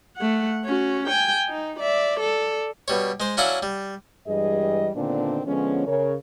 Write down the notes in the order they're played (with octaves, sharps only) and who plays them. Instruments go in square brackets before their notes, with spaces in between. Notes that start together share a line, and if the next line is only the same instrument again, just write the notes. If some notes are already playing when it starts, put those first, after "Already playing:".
[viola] A3 F#5
C#4 F#4
G5 G#5
D#4
D5 E5
A4 D5
[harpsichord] B2 G3 C#5
G#3 C5
F#3 C#4 D4 E4 F5 F#5
G3
[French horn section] G2 E3 G3 G#3 G#4 D#5
A#2 D3 D#3 B3 C4 D4
D3 F3 G#3 B3 C#4
C#3 A#4 C#5